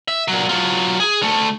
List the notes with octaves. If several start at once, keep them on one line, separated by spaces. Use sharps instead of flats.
E5
A#2 F#3
F#3 F4
G#4
D2 A3